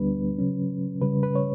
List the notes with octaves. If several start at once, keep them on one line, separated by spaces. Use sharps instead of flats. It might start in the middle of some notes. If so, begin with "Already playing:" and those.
Already playing: D2 D3 G3 B3 D4 B4
C#3 F#3 C#4
C#3 G3 C#4 B4
B4
C#5